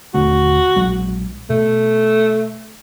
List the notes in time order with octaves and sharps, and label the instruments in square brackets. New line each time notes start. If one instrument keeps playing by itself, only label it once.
[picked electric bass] D#1 D3 A3 [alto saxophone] F#4
[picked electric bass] A#1 F#3 G#3
[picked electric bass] B2 [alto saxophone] A3